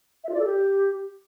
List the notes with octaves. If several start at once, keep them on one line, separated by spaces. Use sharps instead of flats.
E5
F4
D5
A4
G4